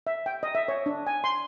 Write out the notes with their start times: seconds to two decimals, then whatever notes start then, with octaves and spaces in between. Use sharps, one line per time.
0.07 E5
0.26 G5
0.43 D#5
0.55 E5
0.68 C#5
0.86 D4
1.07 G#5
1.24 C6